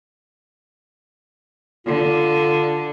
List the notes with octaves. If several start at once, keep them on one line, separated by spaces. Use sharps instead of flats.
D3 F4